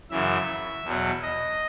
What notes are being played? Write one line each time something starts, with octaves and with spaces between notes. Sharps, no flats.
F#2 C#3 E3 E5
E2 B2 F#3
D#5